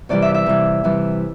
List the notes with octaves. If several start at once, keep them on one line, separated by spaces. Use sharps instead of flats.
C3 E3 G3 D5
E5
E5
C3 E3 G3
C3 E3 G3